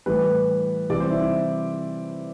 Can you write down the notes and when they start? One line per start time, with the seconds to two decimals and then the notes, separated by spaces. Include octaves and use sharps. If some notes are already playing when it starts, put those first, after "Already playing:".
0.06 A2 E3 G3 B4
0.90 C3 E3 G3 D5
1.00 C5
1.10 E4
1.21 E4